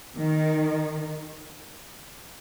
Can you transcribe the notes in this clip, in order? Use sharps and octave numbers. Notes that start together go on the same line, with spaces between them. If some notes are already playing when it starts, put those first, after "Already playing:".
D#3